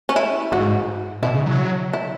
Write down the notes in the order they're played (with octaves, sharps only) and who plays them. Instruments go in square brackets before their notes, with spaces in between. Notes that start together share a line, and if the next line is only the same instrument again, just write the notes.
[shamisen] C#4
E4
[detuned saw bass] G#2 [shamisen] F#4
[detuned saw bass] B2 [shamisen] E4
[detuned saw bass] C#3
F#3
[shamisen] E4